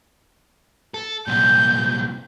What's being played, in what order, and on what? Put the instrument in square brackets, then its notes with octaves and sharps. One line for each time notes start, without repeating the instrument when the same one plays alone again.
[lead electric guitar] A4
[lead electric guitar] C2 A#2 [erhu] G6